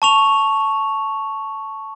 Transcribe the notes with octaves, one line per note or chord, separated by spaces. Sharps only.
A5 C#6 F7